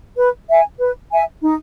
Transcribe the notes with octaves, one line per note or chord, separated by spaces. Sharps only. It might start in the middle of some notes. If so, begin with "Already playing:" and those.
B4
E5 G#5
B4
E5 G#5
D#4